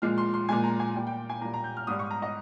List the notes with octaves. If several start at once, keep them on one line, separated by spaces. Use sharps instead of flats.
A#2 F3 G#3 F6
C6
C6
A#2 F3 G#3 G#5
A#5
G#5
A#2 G3 G5
G5
G#5
A#2 G3 A#5
A#5
G6
F6
G#2 G3 D#6
C#6
A#5
D#5